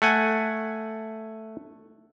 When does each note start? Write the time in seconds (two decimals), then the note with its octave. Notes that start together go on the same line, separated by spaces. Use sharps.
0.02 A3 F#5 G#5